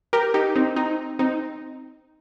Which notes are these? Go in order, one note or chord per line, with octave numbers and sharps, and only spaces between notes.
G4 A#4
D#4 G4
C4 D#4
C4 D#4
C4 D#4